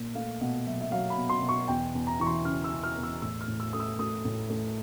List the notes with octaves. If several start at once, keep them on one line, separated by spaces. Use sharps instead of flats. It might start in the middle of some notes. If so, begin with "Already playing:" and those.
Already playing: A#2
A3 F5
B2 F#5
F#3 E5
E5
F#3 F5
B5
B2
C6
B2
C#6
E2 G5
E2
A#5
E3 C#6
C6
C#3 F6
E6
C#3
F6
E2
E6
A2 E6
F6
A2
E6
A3 D#6
E6
A3 D#6
A2
A3